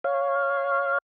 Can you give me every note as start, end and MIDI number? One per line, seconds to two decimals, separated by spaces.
0.04 0.98 73
0.04 0.98 77